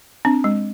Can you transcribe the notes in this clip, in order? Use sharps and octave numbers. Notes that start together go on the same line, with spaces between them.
C4 D4
G#3